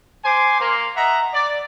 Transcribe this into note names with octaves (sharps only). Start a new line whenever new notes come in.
C5 G#5 C6 D6
A#3 C6
D#5 E5 F#5 A#5
D5